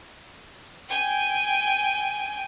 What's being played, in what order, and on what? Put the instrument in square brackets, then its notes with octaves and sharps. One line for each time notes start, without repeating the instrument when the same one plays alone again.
[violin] G5 G#5